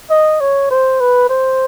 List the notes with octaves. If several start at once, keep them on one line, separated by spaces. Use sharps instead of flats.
D#5
C#5
C5
B4
C5